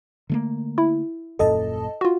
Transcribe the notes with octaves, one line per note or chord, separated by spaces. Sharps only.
D3 A3 A#3
E4
D#1 F#2 A#2 A4 D#5 A5
F4 F#4